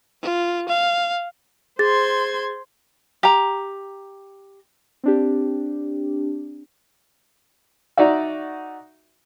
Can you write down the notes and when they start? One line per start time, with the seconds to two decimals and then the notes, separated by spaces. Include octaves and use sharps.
0.22 F4
0.69 F5
1.79 G#4 C5 C6 G#6 A6
3.23 G4 A#5
5.03 C4 D4 G4
7.97 D#4 F#4 D5 E5